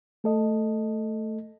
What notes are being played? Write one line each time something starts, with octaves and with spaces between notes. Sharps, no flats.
A3 A4 D#5